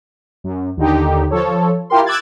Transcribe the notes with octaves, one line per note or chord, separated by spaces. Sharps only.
F#2
D#2 D3 D#4 G4
F3 A4 C#5
E4 F4 G4 A#4 C6
D6 E6 F#6 G#6 A6